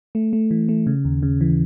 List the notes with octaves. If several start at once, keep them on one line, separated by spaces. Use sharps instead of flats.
A3
A3
E3
A3
C#3
D#2
C#3
E3